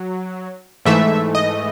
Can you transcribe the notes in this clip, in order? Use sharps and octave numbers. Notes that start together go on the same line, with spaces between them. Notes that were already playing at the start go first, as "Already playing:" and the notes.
Already playing: F#3
G#2 E3 A3 E5
D#5